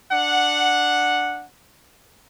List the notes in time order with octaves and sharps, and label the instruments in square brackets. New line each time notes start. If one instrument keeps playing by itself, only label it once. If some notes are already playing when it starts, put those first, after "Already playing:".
[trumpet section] D4 F#5